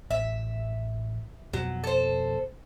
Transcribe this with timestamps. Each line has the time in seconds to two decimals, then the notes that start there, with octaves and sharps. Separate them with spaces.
0.11 A1 E5
1.53 F2 B2 F3 F#3
1.84 A4 C5